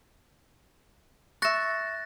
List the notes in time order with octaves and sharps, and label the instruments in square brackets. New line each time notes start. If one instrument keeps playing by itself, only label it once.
[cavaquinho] E5 C#6 [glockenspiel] F#6 A6 A#6